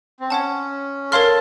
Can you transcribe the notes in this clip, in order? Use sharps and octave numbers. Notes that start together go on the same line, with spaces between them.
C4
C#4 C#5 F#5 A5
A4 A#4 C#5 F5 C6 F6